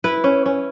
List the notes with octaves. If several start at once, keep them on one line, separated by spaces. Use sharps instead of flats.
E4 B4
C#4
C#4